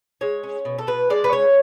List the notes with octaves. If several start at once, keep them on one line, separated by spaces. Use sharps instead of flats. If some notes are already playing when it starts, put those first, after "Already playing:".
G#3 C#5
C#4
B2
A4
B2 B4
G#3 D5
B4
C#4 C#5